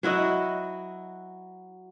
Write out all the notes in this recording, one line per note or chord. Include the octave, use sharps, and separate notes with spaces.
F#3 E4 F#4 D#5